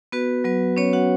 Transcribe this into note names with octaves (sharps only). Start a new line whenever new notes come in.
B3 F#4 B4
F#3 B3 B4
B3 C#4 C#5
F#4 F#5